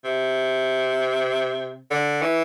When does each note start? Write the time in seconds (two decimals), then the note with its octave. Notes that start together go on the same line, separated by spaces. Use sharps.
0.04 C3
1.91 D3
2.22 E3